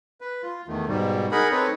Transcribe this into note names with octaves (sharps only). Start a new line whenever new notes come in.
B4
F4
E2 D#3 A3
G#2 B2 G3
D#4 G#4 A#4 F#5 B5
C4 D#4 A4 B4 C#5